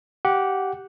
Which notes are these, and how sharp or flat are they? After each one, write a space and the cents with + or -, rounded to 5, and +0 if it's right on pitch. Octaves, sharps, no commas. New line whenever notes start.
G4 -15 F#5 -5